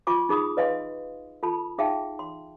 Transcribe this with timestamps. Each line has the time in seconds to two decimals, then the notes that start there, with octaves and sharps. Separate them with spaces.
0.07 F4 G#5 C#6 D6
0.29 D#4 G#4 B5 D#6
0.57 B4 D#5 F5 G#5 C6
1.43 F4 A4 A5 B5
1.78 D#4 G#4 E5 F5 G5 A5
2.19 C6